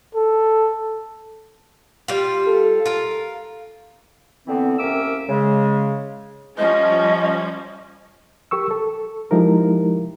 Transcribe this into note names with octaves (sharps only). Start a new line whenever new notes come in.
A4
G3 F4
A4
F4 A#4
D3 E3 B3 C4
C2 A#3 C#4 E5 D6 E6
C#3 G#3
F3 G3 C#4 D#5
G4 A#4 C#6 E6
A4
F3 G#3 D#4 E4 G4 A#4